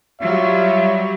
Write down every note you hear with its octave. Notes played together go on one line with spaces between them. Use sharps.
F#3 G3 F4 C#5 E5